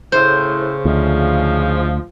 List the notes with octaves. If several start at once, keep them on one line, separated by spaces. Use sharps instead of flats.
A2 C#3 C5
D2 G#2 F3